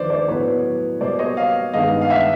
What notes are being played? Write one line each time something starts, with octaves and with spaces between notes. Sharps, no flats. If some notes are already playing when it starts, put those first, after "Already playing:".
Already playing: D#2 D3 F3 B4 C5 D5
C5 D5
A2 F#3 B3 B4 C#5
B2 G3 A#3 C5 D5
C#5 D#5
D#5 F5
G2 D#3 G#3 B3 D#5 F5
F5
E5 F#5